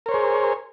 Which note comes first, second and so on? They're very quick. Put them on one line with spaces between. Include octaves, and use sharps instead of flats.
A#4 C#5 C5 G#4